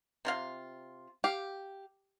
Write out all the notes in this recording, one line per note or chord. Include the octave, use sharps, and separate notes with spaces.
C3 F4 F5
G4 F5